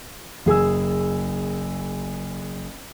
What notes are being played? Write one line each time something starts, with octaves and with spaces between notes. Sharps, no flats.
F#1 G#4 G#5 E6